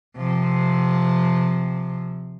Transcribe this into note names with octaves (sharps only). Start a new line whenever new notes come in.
C3 F3